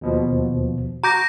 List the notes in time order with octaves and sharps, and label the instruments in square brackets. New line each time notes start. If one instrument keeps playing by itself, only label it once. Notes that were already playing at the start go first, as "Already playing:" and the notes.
[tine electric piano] D#2 B2 F3
[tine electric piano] F#4 D6 [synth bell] A#5 G6 A#6